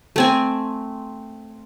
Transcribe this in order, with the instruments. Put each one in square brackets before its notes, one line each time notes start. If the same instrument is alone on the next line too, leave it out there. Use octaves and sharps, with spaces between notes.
[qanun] A3 C4 G#5